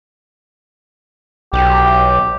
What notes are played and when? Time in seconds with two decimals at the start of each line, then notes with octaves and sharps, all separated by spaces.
1.53 B1 G4